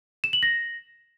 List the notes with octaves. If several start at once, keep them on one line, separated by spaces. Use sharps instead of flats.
E7
F#7
A#6